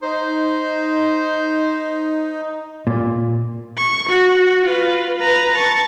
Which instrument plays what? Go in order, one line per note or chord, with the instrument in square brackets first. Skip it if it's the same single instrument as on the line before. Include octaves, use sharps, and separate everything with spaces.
[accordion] D#4 [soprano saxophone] C5
[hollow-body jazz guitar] A#2
[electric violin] C#6
F#4
F4 B4
B4 A#5
A5 C#6